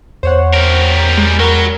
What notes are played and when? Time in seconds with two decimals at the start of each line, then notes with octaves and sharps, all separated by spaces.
0.23 E2 C5 C#5 F#5
0.53 G3 A#4
1.17 G#3
1.40 F#3 A#4 B5